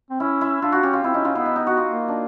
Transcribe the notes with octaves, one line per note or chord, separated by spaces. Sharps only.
C4
C#4 E4
E4
D4 F4
F#4
C#4 G4
F4
C4 E4
C#4 D#4
C#4 F4
B3 E4
D#4
D#4
F#4
F4
A#3
D4